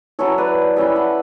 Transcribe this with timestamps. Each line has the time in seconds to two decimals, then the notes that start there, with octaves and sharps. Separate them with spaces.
0.19 F#3 C#4 E4 A4 C#5
0.38 B4 D5
0.76 G3 C#4 E4 E5 G5
0.96 F#5 A5